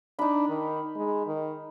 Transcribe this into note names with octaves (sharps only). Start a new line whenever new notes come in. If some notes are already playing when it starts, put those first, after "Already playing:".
D4 D#4 B5
D#3
G#3
D#3